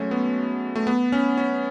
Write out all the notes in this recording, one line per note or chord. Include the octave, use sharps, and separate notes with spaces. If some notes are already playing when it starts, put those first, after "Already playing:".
Already playing: F#3 G#3 A3 C#4
B3
A3
B3
C#4
C#4